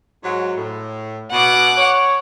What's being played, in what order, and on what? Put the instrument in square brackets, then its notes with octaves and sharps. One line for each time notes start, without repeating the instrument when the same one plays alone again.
[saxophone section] G#2 F#3
A2
[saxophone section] B2 [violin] F#5 D6
[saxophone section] C#5